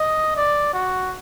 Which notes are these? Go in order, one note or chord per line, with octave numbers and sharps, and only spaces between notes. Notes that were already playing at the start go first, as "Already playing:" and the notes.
Already playing: D#5
D5
F#4